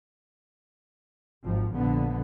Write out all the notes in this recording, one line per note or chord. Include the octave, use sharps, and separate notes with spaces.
G#1 F3
A#1 D3 B3